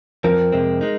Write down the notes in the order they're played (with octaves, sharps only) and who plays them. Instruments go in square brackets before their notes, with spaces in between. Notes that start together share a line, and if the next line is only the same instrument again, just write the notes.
[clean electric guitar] F2 F3 C4 [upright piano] A#4
[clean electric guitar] F2 C3 G#3 C4
G#3 D#4